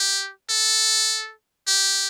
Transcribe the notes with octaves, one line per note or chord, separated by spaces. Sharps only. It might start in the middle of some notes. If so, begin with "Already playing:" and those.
Already playing: G4
A4
G4